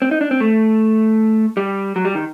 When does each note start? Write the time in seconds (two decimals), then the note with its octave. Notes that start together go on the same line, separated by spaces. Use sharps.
0.02 C4
0.11 D#4
0.21 D4
0.31 C4
0.40 A3
1.57 G3
1.96 F#3
2.05 G3
2.15 D#3